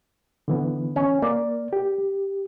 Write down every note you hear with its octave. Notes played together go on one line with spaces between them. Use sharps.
D3 E3 B3
C#4
A#3 D5
G4